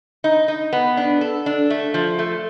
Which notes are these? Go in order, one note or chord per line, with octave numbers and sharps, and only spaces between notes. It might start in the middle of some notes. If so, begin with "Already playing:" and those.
D#4
D#4
B3
D4
A4
D4
A3
F3
A3